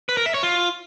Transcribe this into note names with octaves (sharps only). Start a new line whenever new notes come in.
B4
A#4
E5
C#5
F4